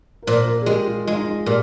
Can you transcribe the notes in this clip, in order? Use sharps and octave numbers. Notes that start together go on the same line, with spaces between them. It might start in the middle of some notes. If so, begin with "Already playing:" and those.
A#4
A#2 C5
A#4
G#4
G#3 G4
F4
G#3 F4
D#4
F4
A#2 G4